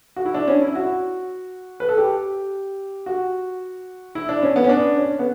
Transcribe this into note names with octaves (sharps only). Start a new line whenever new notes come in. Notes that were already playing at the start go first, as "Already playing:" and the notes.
F#4
E4
D4
C#4
E4
F#4
B4
A4
G4
F#4
E4
D4
C#4
B3
C#4
D4
C#4
B3